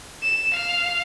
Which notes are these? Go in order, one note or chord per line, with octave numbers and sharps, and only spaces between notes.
E7
F5